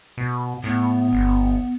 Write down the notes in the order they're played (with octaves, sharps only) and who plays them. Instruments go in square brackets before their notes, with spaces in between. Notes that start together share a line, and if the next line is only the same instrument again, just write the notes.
[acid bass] B2
[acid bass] A2 [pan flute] B3
[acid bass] G1